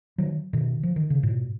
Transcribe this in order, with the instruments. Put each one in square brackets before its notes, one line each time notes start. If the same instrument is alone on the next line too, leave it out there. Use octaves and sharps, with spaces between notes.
[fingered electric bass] D#3 F#3
B2 D#3
F3
D#3
C#3
G#2 B2